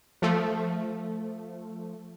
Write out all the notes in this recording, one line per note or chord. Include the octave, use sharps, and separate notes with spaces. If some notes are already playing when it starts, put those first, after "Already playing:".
F3 A3